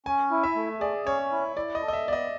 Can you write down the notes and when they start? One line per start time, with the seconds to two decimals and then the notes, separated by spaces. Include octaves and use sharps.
0.06 C#4 G#5
0.31 E4
0.44 E5
0.55 A3
0.80 G#4 D5
1.06 C#4 C#5
1.32 E4
1.57 E4 D5
1.75 D#5
1.82 A4
1.88 D#5
1.93 E5
2.07 B3 D5
2.13 D#5